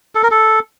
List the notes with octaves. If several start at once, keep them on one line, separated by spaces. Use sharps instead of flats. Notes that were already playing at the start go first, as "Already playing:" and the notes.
A4
A#4
A4